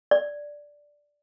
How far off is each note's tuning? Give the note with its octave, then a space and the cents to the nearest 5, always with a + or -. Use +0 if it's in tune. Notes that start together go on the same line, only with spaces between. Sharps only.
D5 -5